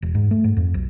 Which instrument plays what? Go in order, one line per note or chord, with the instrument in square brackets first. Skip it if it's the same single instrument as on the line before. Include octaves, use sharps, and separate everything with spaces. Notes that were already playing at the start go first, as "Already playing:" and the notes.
[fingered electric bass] E1
G#2
A3
G#2
F2
B1